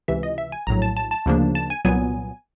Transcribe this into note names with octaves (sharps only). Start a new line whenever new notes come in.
C#2 C3 E3 E5
D#5
E5
G#5
A#1 A2 F#3 A#5
A5
A5
A5
D2 C#3 F3 A#3 D4
A5
G#5
C2 A#2 F#3 B3 G#5